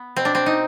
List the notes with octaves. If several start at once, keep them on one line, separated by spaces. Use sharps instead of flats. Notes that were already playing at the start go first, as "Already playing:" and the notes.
Already playing: B3
B2 C4
D4
C4
D#4